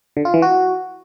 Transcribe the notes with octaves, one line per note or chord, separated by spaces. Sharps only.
D3
F4
E3
F#4